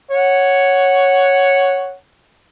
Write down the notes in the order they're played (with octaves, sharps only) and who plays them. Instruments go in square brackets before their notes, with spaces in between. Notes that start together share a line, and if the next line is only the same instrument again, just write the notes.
[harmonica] C#5 F#5